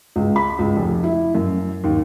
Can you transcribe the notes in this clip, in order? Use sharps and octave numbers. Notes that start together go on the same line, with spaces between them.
C#2
B5
C#2
F1
E4
F#2
D#2